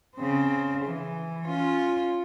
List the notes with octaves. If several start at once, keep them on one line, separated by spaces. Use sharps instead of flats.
C#3 C4
E3
C#4 F4